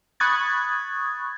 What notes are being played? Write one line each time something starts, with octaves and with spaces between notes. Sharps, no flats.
B5 C#6 D#6 F#6 G#6 A6